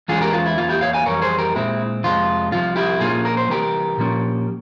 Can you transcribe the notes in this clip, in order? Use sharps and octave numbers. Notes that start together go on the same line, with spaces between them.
E2 E3 G#3 C#4 F4 G#4
G4 A#4
F4
E4
E2 E3 A#3 F4
E4 G4
C#5 F5
F5 G#5
F2 E3 G3 A#4 C#5
G#4 C5
G4 A#4
A#2 G#3 C4 E4
F2 C3 F3 G#3 F4
C2 C3 F3 F4
E4 G4
A#2 F3 A#3 C#4 F4 G#4
A#4
C5
C2 C3 E3 G4 A#4
A#2 F3 A#3 C#4